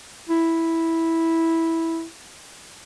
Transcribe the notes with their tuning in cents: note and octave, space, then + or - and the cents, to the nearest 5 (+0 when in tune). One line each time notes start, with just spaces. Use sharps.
E4 -5